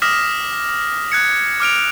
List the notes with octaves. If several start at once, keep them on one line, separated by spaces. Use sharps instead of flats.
D6 D#6 F6 A#6 B6 E7
F#6 G#6 C#7
D6 F6 D7 F7